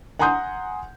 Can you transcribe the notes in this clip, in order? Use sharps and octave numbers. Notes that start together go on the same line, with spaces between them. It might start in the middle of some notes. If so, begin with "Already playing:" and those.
F#5 G#5 A#5 C6 D#6 G6